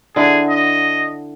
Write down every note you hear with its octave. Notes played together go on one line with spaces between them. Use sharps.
D3 E4 G#4 F#5
D#5